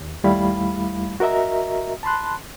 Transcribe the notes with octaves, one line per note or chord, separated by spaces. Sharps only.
D#2
D#2 G3 A3 E4 F5 B5
F#4 A#4 D#5 E5 A#5
A5 B5 C6 F#6